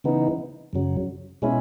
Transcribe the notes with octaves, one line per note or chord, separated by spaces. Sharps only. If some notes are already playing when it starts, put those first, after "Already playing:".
C#3 E3 B3 D#4
F#2 C#3 F#3
B2 G#3 C#4 E4